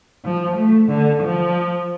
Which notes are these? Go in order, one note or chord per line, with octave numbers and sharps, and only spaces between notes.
F3
A3
D3
F3